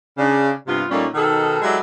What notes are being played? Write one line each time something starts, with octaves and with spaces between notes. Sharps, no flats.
C#3 D4
G2 C3 B3 F4
A#2 G3 A3 A#3 C#4 D#4
B2 D#3 D#4 G#4 A4
F#3 G#3 E4 G4 A4 D5